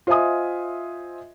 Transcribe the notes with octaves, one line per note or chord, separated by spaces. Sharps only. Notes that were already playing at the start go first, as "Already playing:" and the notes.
F4 C5 D#5 E5 G#5 D#6